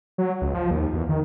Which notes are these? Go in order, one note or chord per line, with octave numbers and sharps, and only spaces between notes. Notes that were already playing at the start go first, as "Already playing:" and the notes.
F#3
C#2
F3
D#2
E2
D#3